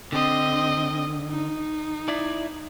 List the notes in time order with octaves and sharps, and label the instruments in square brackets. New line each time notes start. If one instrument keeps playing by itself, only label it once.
[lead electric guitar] D3 [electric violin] C4 D#5
[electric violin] D#4
[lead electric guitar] E4 D5